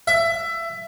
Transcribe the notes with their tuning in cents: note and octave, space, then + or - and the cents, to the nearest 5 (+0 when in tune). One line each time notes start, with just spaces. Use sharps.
E5 +20